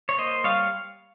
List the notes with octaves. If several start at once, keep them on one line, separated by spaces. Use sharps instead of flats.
C#5
A#3 C5 D#5
G3 C#5 F5